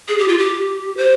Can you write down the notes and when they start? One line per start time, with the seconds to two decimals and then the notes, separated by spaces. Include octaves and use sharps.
0.09 G#4
0.18 G4
0.28 F4
0.38 G4
0.97 C5